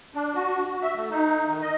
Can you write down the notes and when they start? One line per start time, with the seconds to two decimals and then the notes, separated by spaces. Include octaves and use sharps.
0.14 D4
0.35 F#4
0.82 E5
0.96 A3
1.11 D#4
1.47 D#3
1.62 D#5